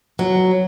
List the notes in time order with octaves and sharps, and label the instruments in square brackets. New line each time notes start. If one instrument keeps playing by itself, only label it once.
[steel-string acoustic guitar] F#3